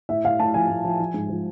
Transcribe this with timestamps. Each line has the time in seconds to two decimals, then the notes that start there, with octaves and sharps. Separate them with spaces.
0.09 A2 E5
0.25 A2 F5
0.40 A2 A5
0.54 F3 G#5
0.70 A2
0.84 F3
1.00 F3
1.14 G#2
1.30 F3